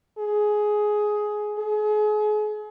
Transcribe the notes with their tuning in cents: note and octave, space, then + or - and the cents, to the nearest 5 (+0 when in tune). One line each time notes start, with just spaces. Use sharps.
G#4 +10
G#4 +35